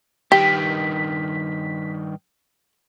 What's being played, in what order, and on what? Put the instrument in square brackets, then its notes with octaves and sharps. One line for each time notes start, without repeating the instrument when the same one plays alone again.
[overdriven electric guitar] G2 D#3 [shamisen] G4 [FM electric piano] B6